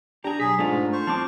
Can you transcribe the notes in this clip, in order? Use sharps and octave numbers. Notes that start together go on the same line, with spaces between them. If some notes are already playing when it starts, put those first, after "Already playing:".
D4 G4 G#4 A#5
B1 G#4 B6
G#2 A3 D4 F4
C5 C#6
F3 C4 A5 D6